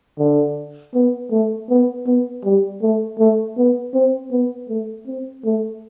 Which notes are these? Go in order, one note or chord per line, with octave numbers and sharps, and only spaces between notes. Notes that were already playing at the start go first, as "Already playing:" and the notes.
D3
B3
A3
B3
B3
G3
A3
A3
B3
C4
B3
A3
C4
A3